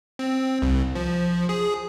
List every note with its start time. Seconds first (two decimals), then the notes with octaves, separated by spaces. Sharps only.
0.19 C4
0.62 C2
0.95 F3
1.49 G#4